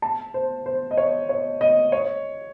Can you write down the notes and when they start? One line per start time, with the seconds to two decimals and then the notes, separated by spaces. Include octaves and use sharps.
0.02 A5
0.34 C5
0.66 C5
0.91 D#5
0.97 C#5
1.29 C#5
1.61 D#5
1.92 C#5